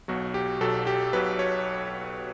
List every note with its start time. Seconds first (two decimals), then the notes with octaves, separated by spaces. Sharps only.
0.08 B1 B2 F#3 F#4
0.34 G4
0.61 B1 B2 F#3 A4
0.87 G4
1.13 B1 B2 F#3 B4
1.39 C#5